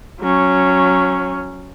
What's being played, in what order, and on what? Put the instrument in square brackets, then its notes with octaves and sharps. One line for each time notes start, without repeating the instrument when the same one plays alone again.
[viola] F#3 C#4